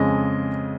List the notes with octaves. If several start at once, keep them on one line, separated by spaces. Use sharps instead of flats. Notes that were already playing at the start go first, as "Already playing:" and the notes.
Already playing: F2 C#3 G#3 D#5